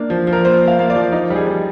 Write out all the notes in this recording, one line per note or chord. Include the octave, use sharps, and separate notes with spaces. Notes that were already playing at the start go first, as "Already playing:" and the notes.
Already playing: A#3 D4
F3
F3
A#4
A#3 C5
A#3
F5
A#3
D5
F3
D#4
G3
G#4
G3